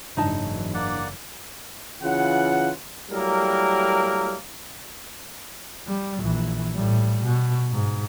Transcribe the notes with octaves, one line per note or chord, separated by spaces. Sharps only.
F#1 G#2 E3 F#3 D4 D#4 A5
A#3 D5 F#5
C#3 E3 F4 F#5
F#3 G3 A3 A#3 E4 A#4
G3
A#1 E3
A2 G3
B2
G#2